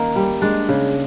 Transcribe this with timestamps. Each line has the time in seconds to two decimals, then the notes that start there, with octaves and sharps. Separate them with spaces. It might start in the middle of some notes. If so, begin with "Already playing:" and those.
Already playing: D#3 A#3 C#4 D#4
0.16 G3
0.42 G#3 D4
0.69 C#3